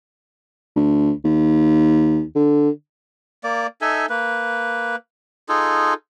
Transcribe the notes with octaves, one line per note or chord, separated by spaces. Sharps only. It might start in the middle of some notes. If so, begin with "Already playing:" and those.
D2
D#2
D3
A#3 D5
D#4 A4 E5 G#5
A#3 B4
D#4 F4 G#4 A4